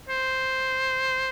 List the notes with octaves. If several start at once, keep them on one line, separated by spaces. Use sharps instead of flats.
C5